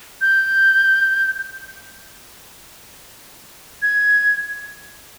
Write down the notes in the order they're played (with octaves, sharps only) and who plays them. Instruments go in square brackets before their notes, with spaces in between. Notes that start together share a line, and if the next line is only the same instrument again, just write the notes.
[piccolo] G6
G#6